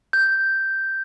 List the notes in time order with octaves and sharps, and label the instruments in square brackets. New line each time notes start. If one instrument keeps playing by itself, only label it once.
[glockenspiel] G6